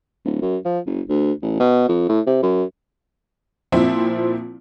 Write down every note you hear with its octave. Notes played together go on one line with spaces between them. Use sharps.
D1
F#2
F3
F#1
D2
A1
B2
F2
A2
C3
F#2
A#2 F3 C4 E4